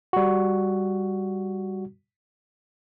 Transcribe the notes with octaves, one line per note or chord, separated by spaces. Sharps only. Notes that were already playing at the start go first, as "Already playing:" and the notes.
G3 F#4